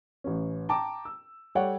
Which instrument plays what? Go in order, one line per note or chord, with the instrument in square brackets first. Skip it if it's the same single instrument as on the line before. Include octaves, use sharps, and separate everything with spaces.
[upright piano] A1 C#4
G5 A5 A#5 D6
E6
G3 A4 C#5 D5 F#5 G5